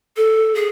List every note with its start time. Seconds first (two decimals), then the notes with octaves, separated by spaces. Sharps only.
0.16 A4
0.55 G#4